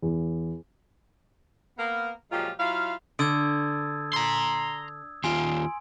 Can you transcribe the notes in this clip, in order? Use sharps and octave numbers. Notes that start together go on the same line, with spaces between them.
E2
A#3 B3 A#4
A#2 F3 F#3 G#3 F4 G4
F#3 E4 F4 F5
D3 D#6 E6 G#6
A#5 C6
D#2 F4 G#5 C6